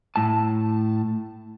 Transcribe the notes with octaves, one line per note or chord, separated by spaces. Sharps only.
A2 A5